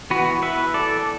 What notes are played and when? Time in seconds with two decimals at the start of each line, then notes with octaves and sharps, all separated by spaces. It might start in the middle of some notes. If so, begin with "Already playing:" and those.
0.10 E3 B3 F#4 B4
0.42 B4 E5
0.74 A4 D5